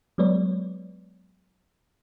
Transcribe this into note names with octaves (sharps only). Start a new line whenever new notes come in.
F#3 G#3 B3 B4 C#5 D5